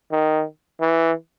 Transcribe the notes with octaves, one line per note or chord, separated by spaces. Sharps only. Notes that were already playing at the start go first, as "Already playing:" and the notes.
D#3
E3